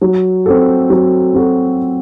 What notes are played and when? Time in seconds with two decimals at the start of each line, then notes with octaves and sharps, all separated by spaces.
0.01 F#3
0.46 C4 F#4 A4
0.90 F#3
1.34 C4 F#4 A4